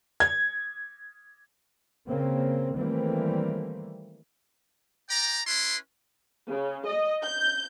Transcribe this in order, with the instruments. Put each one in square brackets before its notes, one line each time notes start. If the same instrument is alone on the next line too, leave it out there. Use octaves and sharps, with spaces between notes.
[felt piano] G#6
[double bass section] C#3 A#3 C4
D#3 E3 G3 A3 A#3 C4
[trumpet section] D5 G5 A#5
C#4 E4 B4 C6
[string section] C#3
D#5
G6